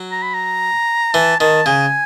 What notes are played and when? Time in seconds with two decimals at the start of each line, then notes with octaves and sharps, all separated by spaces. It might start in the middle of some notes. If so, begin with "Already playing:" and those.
Already playing: F#3
0.11 A#5
0.22 B5
0.34 A#5
1.14 E3 A5
1.40 D#3 A5
1.66 C#3 G#5